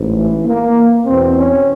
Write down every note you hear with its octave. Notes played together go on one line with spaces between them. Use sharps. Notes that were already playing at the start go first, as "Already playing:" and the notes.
Already playing: A1 G#2
E3
A#3
E2 B2 C4
C#4